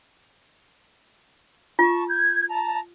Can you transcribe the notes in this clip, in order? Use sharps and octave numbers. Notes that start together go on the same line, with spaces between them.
F4 A5 C#6
G6 G#6
A5 A#5